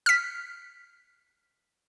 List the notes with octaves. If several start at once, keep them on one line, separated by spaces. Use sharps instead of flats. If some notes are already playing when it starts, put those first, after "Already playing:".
F6 B6